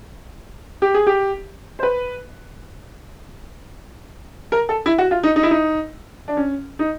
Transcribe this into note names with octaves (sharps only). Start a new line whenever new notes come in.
G4
G#4
G4
C5
B4
A#4
A4
E4
F#4
F4
D#4
D#4
E4
D#4
D4
C#4
D#4